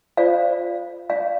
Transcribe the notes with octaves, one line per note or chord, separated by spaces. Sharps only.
F4 A4 C5 D5 F5
D5 F5